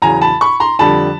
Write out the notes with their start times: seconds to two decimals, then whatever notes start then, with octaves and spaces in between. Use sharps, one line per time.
0.02 E2 C#3 F#3 G#5 A#5
0.21 A5 B5
0.41 B5 C#6
0.60 A#5 C6
0.79 F2 D3 G3 A5 B5